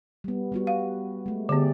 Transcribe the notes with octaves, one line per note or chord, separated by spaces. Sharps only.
G3 B3
G3 B3 F#4
F5
G#3 A3
D3 B3 G4 G#4 D5